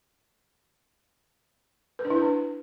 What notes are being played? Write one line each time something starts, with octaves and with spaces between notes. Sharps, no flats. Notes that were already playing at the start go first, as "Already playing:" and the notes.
B4
D4
E4
B4
D4